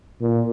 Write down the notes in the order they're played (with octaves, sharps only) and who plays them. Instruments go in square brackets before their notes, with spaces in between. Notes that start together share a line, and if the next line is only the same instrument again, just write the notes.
[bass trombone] A#2